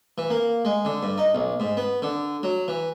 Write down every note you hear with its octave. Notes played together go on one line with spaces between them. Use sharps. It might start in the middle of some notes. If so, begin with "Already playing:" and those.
E3
A#3
G#3
D3
G2
D#4
B1
G#2
B3
D3
F#3
E3